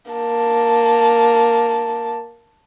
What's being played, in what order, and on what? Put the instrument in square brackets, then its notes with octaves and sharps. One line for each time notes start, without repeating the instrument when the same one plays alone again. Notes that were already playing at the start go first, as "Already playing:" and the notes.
[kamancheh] A#3 A5